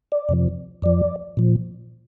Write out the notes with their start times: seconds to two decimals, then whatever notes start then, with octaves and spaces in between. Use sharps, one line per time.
0.12 D5
0.29 F2 C3 F3
0.82 F2 F3 D5
1.37 A#2 F3